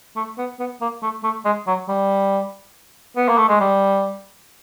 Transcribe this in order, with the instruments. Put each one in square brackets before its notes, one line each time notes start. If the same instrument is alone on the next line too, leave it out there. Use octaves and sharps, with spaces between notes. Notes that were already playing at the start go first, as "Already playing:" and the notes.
[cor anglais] A3
B3
B3
A#3
A3
A3
G#3
F#3
G3
B3
A#3
A3
G#3
G3